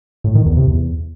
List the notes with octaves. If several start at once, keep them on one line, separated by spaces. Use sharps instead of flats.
A2
D#3
E2
C3
E2